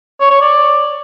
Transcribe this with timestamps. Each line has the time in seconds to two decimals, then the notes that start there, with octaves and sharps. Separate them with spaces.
0.20 C#5
0.31 C#5
0.41 D5